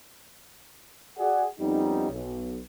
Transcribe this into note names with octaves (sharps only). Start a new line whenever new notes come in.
F#4 G#4 D5 F#5
F2 G3 B3 C#4 D#4
B1